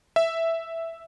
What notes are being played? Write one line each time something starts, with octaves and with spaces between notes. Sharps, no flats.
E5